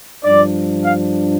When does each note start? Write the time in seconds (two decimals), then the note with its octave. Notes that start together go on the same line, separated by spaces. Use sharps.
0.25 G2 F3 D4 D5
0.83 F5